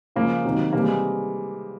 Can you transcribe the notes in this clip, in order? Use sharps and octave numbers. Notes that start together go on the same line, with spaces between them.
C#3 F3 G#3 A#3
C3 D#3 F#3
C3 E3 G3 A#3
G#3